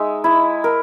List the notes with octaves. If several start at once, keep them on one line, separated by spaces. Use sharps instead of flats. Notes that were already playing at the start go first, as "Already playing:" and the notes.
Already playing: G#3 D#4 E5
E4
A#4